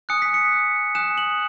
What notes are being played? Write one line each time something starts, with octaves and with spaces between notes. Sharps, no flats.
G#5 D#6 F#6 C#7
B6
C#7
G#5 D#6 F#6 E7
F#7